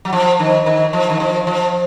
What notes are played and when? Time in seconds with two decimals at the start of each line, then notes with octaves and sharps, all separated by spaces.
0.05 F#3
0.13 F3
0.39 D#3
0.66 D#3
0.93 F3
1.10 D#3
1.20 F3
1.47 F3